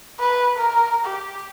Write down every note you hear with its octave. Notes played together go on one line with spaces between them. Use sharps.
B4
A#4
G4